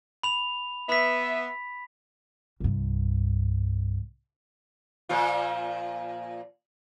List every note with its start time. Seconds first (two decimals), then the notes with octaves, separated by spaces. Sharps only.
0.23 B5 F7
0.89 B3 E5 B5 B6
2.60 C2 G2
5.09 A#2 F3 F4